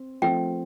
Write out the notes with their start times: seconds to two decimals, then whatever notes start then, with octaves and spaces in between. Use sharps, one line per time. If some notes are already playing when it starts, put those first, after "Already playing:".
Already playing: C4
0.22 F3 A3 C4 G5